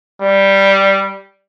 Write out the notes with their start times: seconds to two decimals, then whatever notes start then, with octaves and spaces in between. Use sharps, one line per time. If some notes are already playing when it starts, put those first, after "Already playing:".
0.22 G3